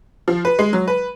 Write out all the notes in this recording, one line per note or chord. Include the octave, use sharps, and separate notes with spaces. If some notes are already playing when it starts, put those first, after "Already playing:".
F3
B4
G#3
F#3
B4